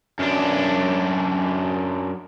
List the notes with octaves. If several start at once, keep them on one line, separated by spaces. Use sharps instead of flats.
F#2 D4